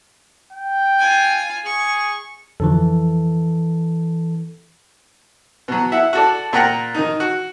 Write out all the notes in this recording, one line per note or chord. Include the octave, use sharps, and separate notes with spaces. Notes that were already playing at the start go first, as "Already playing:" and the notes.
G5
F4 G#5
G#4 C#6
F2 D3 E3 F3 A4
B2 F#3
E4 E5 F#5
F#4 A4 D5
A#2 A#4 F#5 G5 A#5
D#3 D#4
F#4